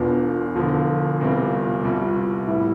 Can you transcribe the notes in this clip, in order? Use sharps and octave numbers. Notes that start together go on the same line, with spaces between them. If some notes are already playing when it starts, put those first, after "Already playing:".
Already playing: E1 E2 B2 B3 D4 F4
E1 E2 D3 F3 F4
E1 E2 C3 G3 C4
C2 B2 G3
A2 G3 B3 E4